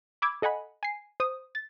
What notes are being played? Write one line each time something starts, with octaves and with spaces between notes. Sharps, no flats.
B5 D6 E6 G#6
A4 D#5 F#5 G#5 B5
G#5 C7
C5 D#6
A6